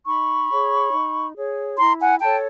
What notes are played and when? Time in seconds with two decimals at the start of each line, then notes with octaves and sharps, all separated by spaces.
0.06 D#4 B5 C#6
0.50 G#4 C#5
0.92 D#4
1.35 G#4 C#5
1.78 E4 A#5 C6
2.00 F#5 G#5
2.20 A4 C#5 G5 A5